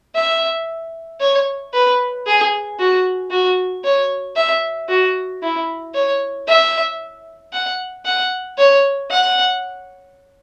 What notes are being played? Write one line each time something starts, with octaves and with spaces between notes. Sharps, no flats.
E5
C#5
B4
G#4
F#4
F#4
C#5
E5
F#4
E4
C#5
E5
F#5
F#5
C#5
F#5